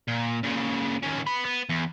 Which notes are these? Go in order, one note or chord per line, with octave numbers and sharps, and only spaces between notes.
A#2
A#2 C#3
D#2 C#4
B3 B5
B3
E2